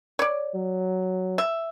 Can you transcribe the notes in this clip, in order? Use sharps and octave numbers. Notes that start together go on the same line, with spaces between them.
C#5 D5
F#3
E5